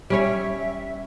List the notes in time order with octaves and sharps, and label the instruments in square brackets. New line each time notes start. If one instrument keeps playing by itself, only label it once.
[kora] G3 C#4 C#5 [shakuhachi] E5